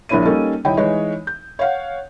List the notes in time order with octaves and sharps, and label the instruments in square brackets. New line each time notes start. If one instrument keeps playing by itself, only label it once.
[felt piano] A#1 A#3 D4 E4 C#5 D#7
G3 A#3 C#4 D#4 A4
D#1 D#4 E4 C#5 G5
E3 G#3 D#4 C#5
G6
C#5 F5 F#5